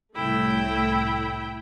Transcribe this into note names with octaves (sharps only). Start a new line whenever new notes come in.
C2 A2 A3 E4 G5